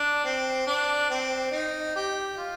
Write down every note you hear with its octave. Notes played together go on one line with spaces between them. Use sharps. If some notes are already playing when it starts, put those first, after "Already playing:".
Already playing: D4
C4
D4
C4
D#4
G4
F4